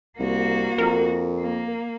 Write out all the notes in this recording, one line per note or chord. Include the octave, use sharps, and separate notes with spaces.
C2 A#3 F#4
F2 A#4
A#3